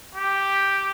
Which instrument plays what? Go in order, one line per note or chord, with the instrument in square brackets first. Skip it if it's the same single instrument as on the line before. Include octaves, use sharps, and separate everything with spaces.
[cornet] G4